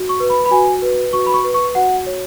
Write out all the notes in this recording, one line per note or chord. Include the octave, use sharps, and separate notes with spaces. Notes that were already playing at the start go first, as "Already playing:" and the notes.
Already playing: F#4
C#6
B4
B5
B5
F#4 G#5
B4
F#4 C#6
B5
C#6
B4
C#6
F#4 F#5
C#5